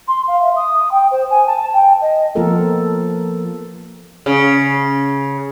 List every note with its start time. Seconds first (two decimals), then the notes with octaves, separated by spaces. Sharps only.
0.08 C6
0.28 F5
0.42 E5
0.56 D#6
0.92 G5
1.11 C5
1.30 G#5
1.47 A5
1.74 G5
2.02 D#5
2.35 F3 A#3 B3 F4 A4 A#4
4.26 C#3